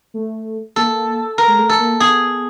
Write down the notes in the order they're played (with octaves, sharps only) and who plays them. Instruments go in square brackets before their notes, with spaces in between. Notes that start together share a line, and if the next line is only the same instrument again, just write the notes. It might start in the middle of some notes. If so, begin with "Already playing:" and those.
[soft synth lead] A3
[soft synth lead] A#3 [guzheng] A4
[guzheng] A#4
[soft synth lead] G#3
A3
[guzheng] A4
[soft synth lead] A#3
[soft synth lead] B3 [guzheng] G#4